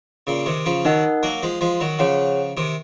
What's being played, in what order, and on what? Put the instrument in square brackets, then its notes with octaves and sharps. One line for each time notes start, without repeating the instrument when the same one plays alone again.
[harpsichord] A#2 C#3
C3 D#3
C#3 F3
[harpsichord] D#3 F#3 [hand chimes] D#4 A#4 D#5 F#5
[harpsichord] F#3 A#3
F3 G#3
F3 G#3
D#3 F#3
[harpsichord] C#3 F3 [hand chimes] G#4 C#5 F#5
[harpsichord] C3 D#3